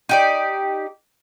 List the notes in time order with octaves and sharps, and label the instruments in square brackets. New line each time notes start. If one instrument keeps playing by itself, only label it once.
[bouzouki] D#4 G4 D5